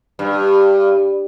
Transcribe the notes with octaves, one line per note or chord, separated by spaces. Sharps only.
G2